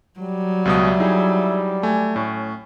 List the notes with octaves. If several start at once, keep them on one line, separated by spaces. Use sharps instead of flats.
F#3 G3
C#2 B2 E5 D#6
D#4 E4 G#4
A3 G#5
A2 C#4